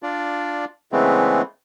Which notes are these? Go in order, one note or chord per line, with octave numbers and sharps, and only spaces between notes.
D4 F4 D5
C#3 E3 G#3 A3 B3 C4